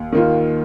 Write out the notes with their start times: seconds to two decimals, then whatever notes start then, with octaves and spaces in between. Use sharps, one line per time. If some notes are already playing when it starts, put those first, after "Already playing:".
Already playing: D#2
0.12 D#3 A#3 F4